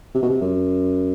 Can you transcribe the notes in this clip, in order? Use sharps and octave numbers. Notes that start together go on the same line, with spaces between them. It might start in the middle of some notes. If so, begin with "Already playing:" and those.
C3
B2
C3
F#2